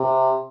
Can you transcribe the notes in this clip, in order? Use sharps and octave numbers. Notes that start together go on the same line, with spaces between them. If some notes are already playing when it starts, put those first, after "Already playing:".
Already playing: C3